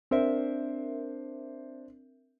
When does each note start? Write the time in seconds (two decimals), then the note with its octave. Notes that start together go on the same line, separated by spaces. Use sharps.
0.11 C4 D4 A#4 C5 E5